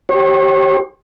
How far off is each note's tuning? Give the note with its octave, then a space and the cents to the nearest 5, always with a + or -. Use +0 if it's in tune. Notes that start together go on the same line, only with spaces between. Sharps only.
G4 -20 C#5 -40